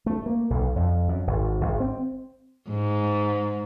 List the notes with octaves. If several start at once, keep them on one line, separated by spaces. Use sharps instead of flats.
A3
A#3
B1
F2
F#2
G#1
G#1
C4
G#2